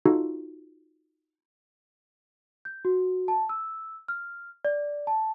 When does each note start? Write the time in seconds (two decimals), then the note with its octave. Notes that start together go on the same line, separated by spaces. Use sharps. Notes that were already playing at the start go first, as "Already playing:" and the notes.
0.05 D#4 F4 F#4 A4
2.65 G6
2.85 F#4
3.28 A5
3.49 E6
4.08 F6
4.65 D5
5.07 A5